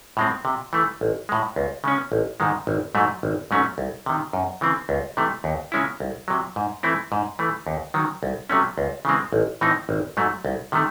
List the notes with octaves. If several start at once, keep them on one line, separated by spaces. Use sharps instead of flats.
A2 G#3 C4
C3
E3 A3
A1
A2 G#3
C#2
C#3 G#3 C#4
A1
G#2 D#3 G#3
G#1
G#2 F#3 A3
G#1
G#2 F#3 A3 C#4
C2
C3 D#3
F#2
C#3 E3 C4
C#2
C3 E3 A3
D#2
C#3 G#3 C#4 E4
C2
C3 F#3
G#2
E3 A3 C4 E4
G#2
E3 A3
D#2
D#3 F#3
C2
C3 F#3 A3 C#4
C#2
C#3 E3 G#3 C4
A1
A2 E3 C4 D#4
G#1
G#2 F#3 A3
C2
C3 D#3 A3